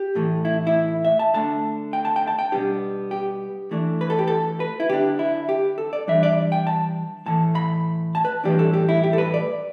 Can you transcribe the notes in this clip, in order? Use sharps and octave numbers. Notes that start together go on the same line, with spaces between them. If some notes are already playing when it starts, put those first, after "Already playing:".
Already playing: G4
A2 E3 A3
E4
E4
E5
A5
D3 A3 D4 A5
G5
A5
G5
A5
G5
B2 G3 B3 D4 G4
G4
E3 A3 D4
B4
A4
G4
A4
B4
E4
D3 B3 D4 G4
E4
G4
A4
D5
E3 G3 D4 E5
D5
G5
A5
A2 E3 A3 A5
B5
A5
B4
A2 E3 G3 D4 G4
A4
G4
E4
G4
A4
B4
D5